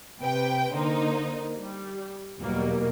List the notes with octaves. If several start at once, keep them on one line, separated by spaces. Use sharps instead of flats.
C3 B4 G5
D3 A#3 D#4 C5
G3
E2 B2 F#3 G3 A#3